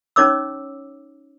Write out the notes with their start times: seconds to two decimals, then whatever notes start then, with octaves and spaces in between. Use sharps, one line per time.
0.16 C#4 D#4 C#5 D6 E6